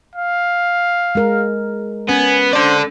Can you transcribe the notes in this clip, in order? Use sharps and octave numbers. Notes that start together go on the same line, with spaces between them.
F5
G#3 A#4
B3 C#4 G#5
A4 C5 D5